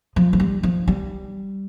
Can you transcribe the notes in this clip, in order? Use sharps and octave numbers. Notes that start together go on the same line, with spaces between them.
F3
F3
G3
F3
G3